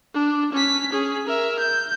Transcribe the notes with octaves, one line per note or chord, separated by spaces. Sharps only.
D4
C#4 B6
C#4 G#4
A#4 E5
G6